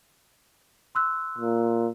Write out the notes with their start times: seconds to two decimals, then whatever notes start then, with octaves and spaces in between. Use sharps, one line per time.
0.95 C6 E6 F#6
1.38 A#2